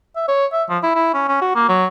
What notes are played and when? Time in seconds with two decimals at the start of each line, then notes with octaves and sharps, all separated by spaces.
0.16 E5
0.28 C#5
0.53 E5
0.70 F3
0.83 E4
0.95 E4
1.14 C#4
1.28 C#4
1.42 F#4
1.55 A#3
1.68 F#3